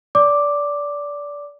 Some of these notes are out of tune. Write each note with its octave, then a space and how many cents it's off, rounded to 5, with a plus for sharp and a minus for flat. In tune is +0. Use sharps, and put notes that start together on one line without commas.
D5 -20 D6 +0